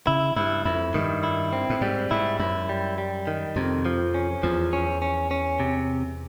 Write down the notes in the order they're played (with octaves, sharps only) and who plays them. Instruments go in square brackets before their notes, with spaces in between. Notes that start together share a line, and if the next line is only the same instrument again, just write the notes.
[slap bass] C#3 [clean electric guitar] E4
[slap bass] G2 [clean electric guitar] E4
[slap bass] F2 [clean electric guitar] E4
[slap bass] G2 [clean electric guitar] D#3
[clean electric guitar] E4
C4
[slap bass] A2
[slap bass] G#2 [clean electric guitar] G3
[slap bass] G#2 [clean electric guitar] E4
[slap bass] F#2 [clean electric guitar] E4
[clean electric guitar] G3
G3
D#3
[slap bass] F2 [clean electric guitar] C3
[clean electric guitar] F3
C#4
[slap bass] E2 [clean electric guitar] F3
[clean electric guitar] C#4
C#4
C#4
C3